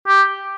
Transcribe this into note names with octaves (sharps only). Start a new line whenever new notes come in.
G4